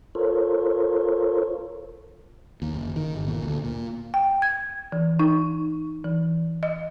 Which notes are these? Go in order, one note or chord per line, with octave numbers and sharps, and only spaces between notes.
F4 A4 A#4 C5 C#5
D#2
F#1
D#3
G1
A#2
D2
A#2
G5
G#6
E3
D#4
E3
D#5